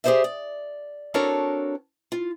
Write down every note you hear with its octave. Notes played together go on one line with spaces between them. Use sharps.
G4 G#4 A#4 C5 D5 E5
D5
C4 D4 F#4 A4 A#4 C#5
F4